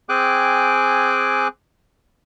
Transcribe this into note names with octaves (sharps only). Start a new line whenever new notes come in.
C4 G#4 G5 G#5 D6 F#6